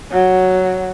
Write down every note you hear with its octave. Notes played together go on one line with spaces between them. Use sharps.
F#3